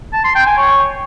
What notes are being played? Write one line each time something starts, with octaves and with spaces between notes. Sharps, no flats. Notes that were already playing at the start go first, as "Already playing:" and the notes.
A5
C6
G5
G#5
C#5